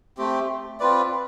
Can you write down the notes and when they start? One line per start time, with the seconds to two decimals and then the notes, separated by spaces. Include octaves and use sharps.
0.18 A3 C4 G4
0.80 C4 F4 B4 D5